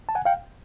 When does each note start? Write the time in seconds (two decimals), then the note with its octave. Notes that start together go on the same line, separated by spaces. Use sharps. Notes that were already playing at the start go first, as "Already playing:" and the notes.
0.09 A5
0.15 F#5 G#5
0.25 F5 G5